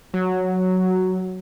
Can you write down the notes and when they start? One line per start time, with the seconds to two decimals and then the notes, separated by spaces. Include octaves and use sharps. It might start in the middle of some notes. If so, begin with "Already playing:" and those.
0.14 F#3